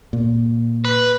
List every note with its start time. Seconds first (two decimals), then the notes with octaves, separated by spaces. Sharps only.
0.13 A#2
0.85 B4